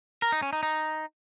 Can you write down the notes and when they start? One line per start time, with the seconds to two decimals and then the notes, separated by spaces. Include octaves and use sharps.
0.22 A#4
0.32 D#4
0.42 C#4
0.53 D#4
0.63 D#4